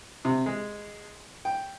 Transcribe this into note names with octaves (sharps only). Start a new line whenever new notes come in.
C3
G#3
G5